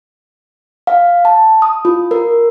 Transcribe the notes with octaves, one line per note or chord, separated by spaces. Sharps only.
F5
A5
D#6
F4
A#4